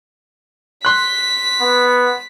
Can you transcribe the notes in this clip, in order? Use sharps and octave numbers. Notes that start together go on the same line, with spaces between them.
C6 F#6 B6
B3